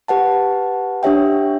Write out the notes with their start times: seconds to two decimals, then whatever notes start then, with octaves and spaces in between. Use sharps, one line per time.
0.08 G4 B4 F#5 A5
1.03 D4 G4 C#5 E5 G5